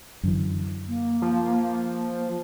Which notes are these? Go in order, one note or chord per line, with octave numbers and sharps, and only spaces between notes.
F#2 D3 E3
A#3
F3